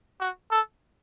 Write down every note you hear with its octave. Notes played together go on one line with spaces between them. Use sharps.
F#4
A4